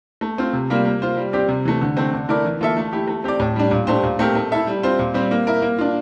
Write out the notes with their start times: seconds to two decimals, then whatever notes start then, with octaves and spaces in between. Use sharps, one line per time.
0.21 A3
0.38 C4 F4
0.53 C3
0.70 G3 A#3 F4
0.85 A#3
1.02 F4 C5
1.17 G3
1.33 C4 G4 D5
1.48 C3
1.65 E3 A3
1.81 D3
1.97 A3 C4
2.13 D3
2.29 A3 E4 A#4 D5
2.45 E3
2.61 A#3 F4 A4 E5
2.77 A3
2.93 E4 G4
3.08 A3
3.24 C4 G4 D5
3.40 A2
3.56 G3 D4
3.71 A#2
3.87 A3 D4 G4 C5
4.03 A#2
4.19 A3 C4 G4 A#4
4.35 A3
4.52 E4 A4 E5
4.67 G3
4.83 C4 F4 C5
4.99 A#2
5.14 G3 C4 G4
5.31 A#3
5.47 E4 A#4 E5
5.62 A#3
5.78 D4 F4